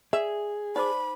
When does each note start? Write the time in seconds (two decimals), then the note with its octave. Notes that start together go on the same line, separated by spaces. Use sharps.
0.13 G#4 D5 E5
0.76 D#4 C5 D5 B5 D6